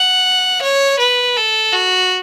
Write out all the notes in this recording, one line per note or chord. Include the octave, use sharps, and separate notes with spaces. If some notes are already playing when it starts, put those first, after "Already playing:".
Already playing: F#5
C#5
B4
A4
F#4